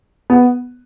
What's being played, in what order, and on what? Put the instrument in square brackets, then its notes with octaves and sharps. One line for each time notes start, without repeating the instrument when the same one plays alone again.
[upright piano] B3